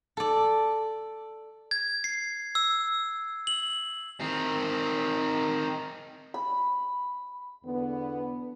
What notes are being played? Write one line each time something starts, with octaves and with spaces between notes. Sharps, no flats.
A4 D5
G#6
C7
E6
F#7
D#3 C4
B5
E2 D3 B3